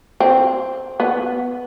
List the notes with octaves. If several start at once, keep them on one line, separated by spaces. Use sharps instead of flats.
C4
B3